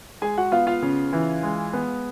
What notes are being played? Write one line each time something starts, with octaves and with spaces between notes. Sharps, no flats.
G#3 G#4 G#5
F#4 F#5
B3 F4 F5
F4 F5
C#3
E3
G#3
B3